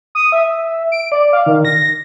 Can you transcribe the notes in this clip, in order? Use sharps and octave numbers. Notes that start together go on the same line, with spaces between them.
D#6
E5
D7
D5
F5
D#3
A#6